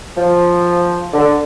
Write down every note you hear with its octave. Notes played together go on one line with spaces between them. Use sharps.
F3
D3